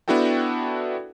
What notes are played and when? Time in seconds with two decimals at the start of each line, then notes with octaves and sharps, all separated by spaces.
0.08 B3 D4 E4 F#4 A4 G5